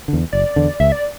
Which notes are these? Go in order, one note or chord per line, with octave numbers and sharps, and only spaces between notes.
D3
E2
F#1 D5
E2 D3
C#2 E5
D5